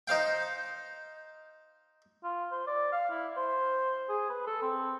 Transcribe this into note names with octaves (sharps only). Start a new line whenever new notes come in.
D#4 C5 F5 G5
F4
C5
D5
F5
E4
C5
G#4
B4
A4
C4